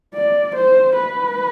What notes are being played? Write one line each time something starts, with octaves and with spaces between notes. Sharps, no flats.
D5
C5
B4